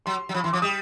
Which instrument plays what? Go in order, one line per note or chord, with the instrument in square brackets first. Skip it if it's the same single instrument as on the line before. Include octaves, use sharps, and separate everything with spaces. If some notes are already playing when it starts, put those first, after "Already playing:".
[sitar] F#3 [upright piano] C6
[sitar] F#3
[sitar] F3 [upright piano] B5
[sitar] E3 [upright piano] C6
[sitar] F3 [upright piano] D6
[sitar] G3 [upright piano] D#6